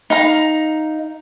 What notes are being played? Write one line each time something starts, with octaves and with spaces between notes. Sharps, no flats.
D#4 F5 A#5